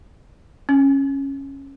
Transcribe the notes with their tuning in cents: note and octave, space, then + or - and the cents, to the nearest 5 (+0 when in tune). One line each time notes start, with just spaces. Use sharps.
C#4 -15